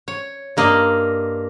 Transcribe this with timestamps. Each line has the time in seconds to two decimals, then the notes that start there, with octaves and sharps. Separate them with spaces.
0.08 C#5
0.57 G2 A#3 D#5 C6